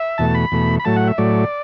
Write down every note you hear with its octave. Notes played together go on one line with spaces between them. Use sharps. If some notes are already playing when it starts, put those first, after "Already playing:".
Already playing: E5
E2 B2 A3 A5
B5
E2 B2 A3
B5
A2 F#3 A3 A5
F#5
E5
A2 F#3 A3 D5